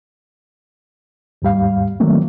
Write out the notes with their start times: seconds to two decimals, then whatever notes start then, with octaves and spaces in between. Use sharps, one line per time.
1.42 D#2 G#2 G3 F5
2.00 D#3 E3 F#3 A3 A#3 C4